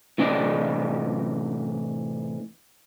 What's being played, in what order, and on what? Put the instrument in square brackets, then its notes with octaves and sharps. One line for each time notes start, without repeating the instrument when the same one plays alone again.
[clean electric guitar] A2 C3 E3 D4 D5 D#5